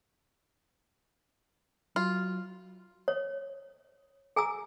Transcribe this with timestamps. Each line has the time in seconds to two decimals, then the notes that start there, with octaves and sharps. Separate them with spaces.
1.96 F#3 F4
3.08 C#5
4.36 G#4 G#5 A#5 E6